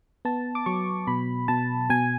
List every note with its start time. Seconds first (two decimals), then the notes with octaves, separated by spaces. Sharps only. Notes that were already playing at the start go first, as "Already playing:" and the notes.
0.25 B3 A5
0.55 D6
0.66 F#3 C#6
1.07 B2 B5
1.48 B2 A5
1.90 B2 G#5